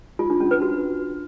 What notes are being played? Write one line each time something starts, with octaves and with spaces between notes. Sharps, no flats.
F4
D4
C#4
B4
F#4